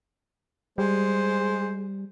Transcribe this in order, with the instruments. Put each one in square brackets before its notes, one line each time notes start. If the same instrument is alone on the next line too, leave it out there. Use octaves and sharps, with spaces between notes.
[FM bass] G3 [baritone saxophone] G#3 [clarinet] C5